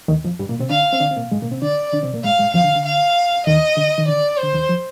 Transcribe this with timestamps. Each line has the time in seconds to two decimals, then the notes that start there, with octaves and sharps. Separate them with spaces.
0.08 D#2 D#3
0.24 F2 F3
0.39 G2 G3
0.49 A#2 A#3
0.59 C3 C4
0.70 D3 D4 F5
0.93 C4
1.00 D3 D4
1.11 C4
1.16 A#2 A#3
1.32 G#2 G#3
1.42 A#2 A#3
1.52 C3 C4
1.62 D3 D4 D5
1.93 D3 D4
2.03 C3 C4
2.13 A#2 A#3
2.24 G#2 G#3 F5
2.39 G#2 G#3
2.54 F2 F3 F5
2.64 D3
2.75 D3
2.85 F5
3.47 D#2 D#3 D#5
3.77 D3
3.98 D#3
4.08 D3 D5
4.38 D3 C5
4.53 D#2 D#3
4.69 F3